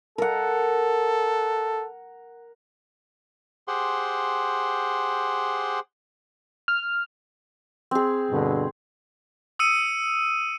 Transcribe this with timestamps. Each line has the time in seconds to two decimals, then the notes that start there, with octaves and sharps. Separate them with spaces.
0.18 A4 A#4 F#5
3.68 G4 G#4 C5 F#5 C6
6.68 F6
7.91 C4 G#4
8.31 G2 B2 D3
9.59 D#6 E6 C#7 D#7